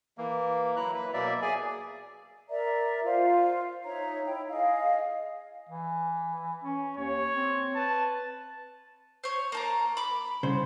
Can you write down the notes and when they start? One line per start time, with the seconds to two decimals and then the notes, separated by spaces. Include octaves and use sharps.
0.18 E3 A#3
0.76 F#3 E4 A#5 F#6
0.94 B4
1.13 B2 F#3 A#3 D5 E5
1.42 G#4 D5 G#5
2.50 A#4 D5 E5 A#5
3.04 F4 C5 F5
3.84 D#4 C#5 E5 A#5
4.26 E4 G5
4.50 G#4 D#5 F5
5.69 E3
6.63 C#4
6.97 D#2 C#5
7.36 C4
7.75 B4 A5
9.24 C5 C#5
9.52 A#3 A5 A#5
9.97 B5 D6
10.43 C2 C#3 C5